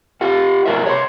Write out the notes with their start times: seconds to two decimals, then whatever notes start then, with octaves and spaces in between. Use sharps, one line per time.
0.21 F4 G4 F5 F#5
0.65 F#4 G#4 A#4 D#5 E5
0.86 C#5 D#5 F#5 C6